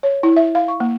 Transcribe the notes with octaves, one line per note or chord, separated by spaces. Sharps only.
C#5
E4
E5
F5
C#6
A#3